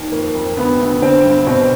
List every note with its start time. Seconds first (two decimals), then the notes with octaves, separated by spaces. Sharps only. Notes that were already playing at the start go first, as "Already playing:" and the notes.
Already playing: D#2
0.12 F2 A#3
0.35 F2
0.57 D2 B3
0.80 D2
1.02 D3 C4
1.24 G2
1.47 B2 C4